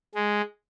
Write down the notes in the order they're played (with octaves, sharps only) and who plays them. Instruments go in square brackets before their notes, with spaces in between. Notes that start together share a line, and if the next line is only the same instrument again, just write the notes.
[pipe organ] G#3